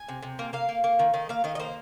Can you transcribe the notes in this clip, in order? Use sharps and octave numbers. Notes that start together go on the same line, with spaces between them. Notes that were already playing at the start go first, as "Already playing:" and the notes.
Already playing: G#5
C3
C3
A#3
A#3 F5
A#3
A#3
D#3
D#3 D#5
A#3 F5
D#3 D#5
D#5
A#3 C5